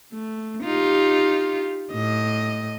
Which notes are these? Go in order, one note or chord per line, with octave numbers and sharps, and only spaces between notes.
A3
D#4 F4 G4
A2 D#5